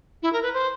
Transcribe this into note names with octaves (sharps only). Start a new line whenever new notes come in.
E4
A#4
B4
C5